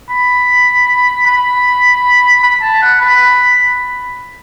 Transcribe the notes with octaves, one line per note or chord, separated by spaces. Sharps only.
B5
B5
B5
A5
F#5
B5